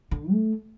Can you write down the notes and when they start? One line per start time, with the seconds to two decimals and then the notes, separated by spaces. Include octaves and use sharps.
0.11 D3
0.31 A3